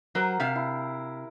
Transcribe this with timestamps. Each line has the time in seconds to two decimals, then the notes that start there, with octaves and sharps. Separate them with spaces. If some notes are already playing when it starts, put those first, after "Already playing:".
0.15 F#3 A#4 C5
0.40 C3 F5
0.55 E4